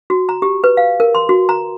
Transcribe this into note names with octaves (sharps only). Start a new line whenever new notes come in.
F#4
A#5
G4
B4
F5
A#4
C6
F#4
A#5